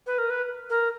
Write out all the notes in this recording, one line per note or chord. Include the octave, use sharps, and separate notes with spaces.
B4
A#4
B4
A#4